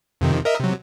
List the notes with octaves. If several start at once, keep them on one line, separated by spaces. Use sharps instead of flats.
F2 C3 D#3
A#4 D#5 E5
C3 F#3